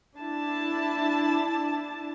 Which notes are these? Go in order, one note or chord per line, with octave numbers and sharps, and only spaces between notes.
D4 E4 A5